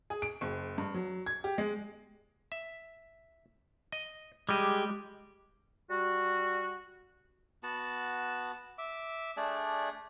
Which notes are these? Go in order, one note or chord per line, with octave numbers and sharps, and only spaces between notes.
G#4
D7
F#1
G2
F#3
G#6
G4
G#3
E5
D#5
G3 G#3 G4 D#5
G3 F#4
B3 F#4 A5
E5 D6
A3 D4 G#4 D5